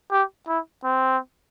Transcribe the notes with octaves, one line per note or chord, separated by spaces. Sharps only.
G4
E4
C4